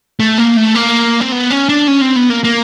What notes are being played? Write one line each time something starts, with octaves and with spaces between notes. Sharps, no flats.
A3
A#3
A3
A#3
C4
B3
C#4
D4
C#4
C4
B3
A#3
A#3